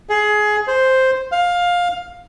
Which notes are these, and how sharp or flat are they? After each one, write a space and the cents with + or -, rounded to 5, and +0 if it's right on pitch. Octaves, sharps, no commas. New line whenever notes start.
G#4 +20
C5 +0
F5 +15